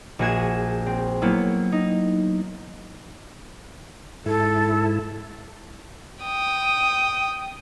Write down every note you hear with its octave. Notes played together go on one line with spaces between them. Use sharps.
A#1 F#4 G#4 G#6 E7
C4
F#3 A#3 B3 E4
D#4
G#2 E4 A4
G5 D#6